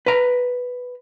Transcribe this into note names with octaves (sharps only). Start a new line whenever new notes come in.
B4 A#5